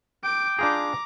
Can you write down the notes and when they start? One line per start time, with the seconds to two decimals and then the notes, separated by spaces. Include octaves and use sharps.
0.24 G5 D6 D7
0.59 D4 F4 G#4 A#5 D6